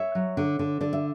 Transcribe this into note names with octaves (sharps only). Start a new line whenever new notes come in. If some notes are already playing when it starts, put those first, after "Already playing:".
Already playing: C#5 E5
F#3
D3
D3
D3 D5
E5